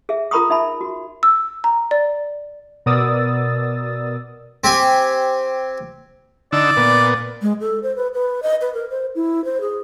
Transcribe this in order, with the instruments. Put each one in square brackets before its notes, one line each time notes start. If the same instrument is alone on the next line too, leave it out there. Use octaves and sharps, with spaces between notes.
[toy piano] G#4 E5
F4 A#4 A#5 B5 C#6 D#6
D#4 E5 A5 B5
F#4
[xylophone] E6
A#5
D5
[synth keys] B2 A#4 D5 D#6 E6 A6
[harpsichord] C4 G4 G#5
[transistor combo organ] D3 D#4 E6 [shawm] D5
[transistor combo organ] A#2 B3
[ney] G#3
A4
C5
B4
B4
D#5
B4
A#4
C5
E4
C5
G#4